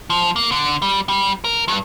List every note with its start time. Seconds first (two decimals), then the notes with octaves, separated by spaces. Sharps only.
0.10 F3
0.36 A#3
0.52 D3
0.82 G3
1.09 G3
1.44 A#4
1.68 G2